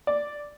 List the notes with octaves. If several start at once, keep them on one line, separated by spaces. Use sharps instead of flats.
D5